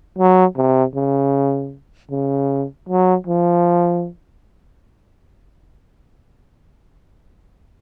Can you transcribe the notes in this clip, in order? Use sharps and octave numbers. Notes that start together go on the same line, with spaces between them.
F#3
C3
C#3
C#3
F#3
F3